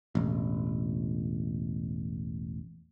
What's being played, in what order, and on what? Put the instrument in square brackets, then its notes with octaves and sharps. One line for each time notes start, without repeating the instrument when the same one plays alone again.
[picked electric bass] E1 A1